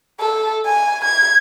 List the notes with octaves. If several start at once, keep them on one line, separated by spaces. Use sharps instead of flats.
A4
G#5
G#6